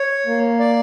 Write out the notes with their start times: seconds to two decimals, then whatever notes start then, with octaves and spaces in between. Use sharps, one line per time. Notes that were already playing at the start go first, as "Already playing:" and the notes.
Already playing: C#5
0.26 A#3
0.59 D5